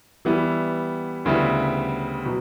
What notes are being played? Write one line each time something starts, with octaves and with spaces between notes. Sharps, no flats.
E3 G3 B3 E4
D2 C#3 G3 B3 E4
B2 F#3